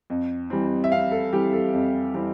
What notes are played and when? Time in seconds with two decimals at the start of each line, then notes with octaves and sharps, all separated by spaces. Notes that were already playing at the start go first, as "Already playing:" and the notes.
0.10 F2
0.50 E3 G3 C4
0.84 E5
0.92 F2 F5
1.12 A4
1.33 E3 G3 C4 G4
1.53 A4
1.73 F2
2.14 E3 G3 C4